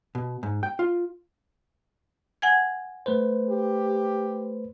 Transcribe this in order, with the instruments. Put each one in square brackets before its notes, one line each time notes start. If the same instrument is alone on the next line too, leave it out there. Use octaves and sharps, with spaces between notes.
[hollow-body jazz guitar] B2
G#2
G5
F4
[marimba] F#5 G#5 G#6
[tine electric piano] A3 B4 C5
[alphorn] G4